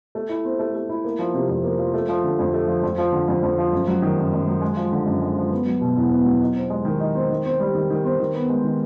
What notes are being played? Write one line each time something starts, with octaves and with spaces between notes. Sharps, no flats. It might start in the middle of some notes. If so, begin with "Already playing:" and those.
A3
E4
C4
A3
A3
E4
A#3
F3
C3
F2
A#3
F3
A3
F3
D3
F2
A3
F3
F2
F3
D3
F2
F2
F3
F#2
F#3
D#3
F#2
F#2
F#3
G#3
F3
D3
F#2
G#3
F3
B3
F#3
B2
E2
B3
F#3
D#4
C4
G#3
D#3
D#4
C4
D#3
C4
G3
D#3
D#3
C4
D#3
B3
G#3
D#3